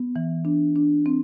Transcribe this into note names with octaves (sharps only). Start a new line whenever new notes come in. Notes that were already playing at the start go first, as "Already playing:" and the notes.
Already playing: B3
E3
D4
D4
C4